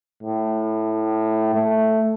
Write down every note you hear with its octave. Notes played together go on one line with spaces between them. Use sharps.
A2
A3